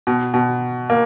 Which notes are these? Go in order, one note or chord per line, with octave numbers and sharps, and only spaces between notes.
B2
B2
A#3